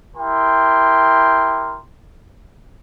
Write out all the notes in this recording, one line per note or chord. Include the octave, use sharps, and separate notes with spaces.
E4 G4 A#4 G5 C6